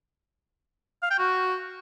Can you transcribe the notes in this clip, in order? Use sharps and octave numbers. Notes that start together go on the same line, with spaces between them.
F5
G5
F#4